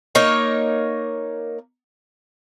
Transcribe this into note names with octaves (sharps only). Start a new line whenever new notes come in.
A#3 D#4 A#4 C#5